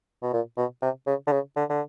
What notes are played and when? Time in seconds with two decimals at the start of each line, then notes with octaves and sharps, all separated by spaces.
0.23 B2
0.33 A#2
0.57 B2
0.82 C3
1.07 C#3
1.27 D3
1.32 C#3
1.56 D3
1.70 D3